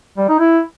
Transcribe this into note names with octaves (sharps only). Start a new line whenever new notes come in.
G3
D#4
E4